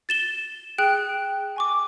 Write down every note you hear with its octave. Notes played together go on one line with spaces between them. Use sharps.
A6 E7 G7
G#4 G5 F#6
G#5 C#6 D6